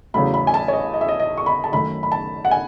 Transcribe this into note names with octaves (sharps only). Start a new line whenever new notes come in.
E2 C#3 F#3 A3 B5
B5
G#5
A5
C#5
D#5
D#5
E5
D#5
D#5
C#6
B5
A5
F#2 D#3 F#3 A3 B5
B5
A5
F#5
G#5